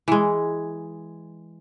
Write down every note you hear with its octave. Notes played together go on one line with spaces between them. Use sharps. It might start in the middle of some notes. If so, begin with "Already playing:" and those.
E3 G#3